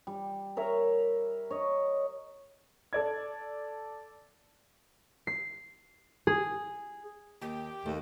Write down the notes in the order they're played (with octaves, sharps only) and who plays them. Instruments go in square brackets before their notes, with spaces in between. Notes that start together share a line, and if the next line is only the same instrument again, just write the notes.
[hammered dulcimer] G3
A#4 C#5 E5 A#5
C#5 D#5
[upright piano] A4 D5 G#6
[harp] C7
G#4
[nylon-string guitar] D#2 [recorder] G4
[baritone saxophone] D#2 [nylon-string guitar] A3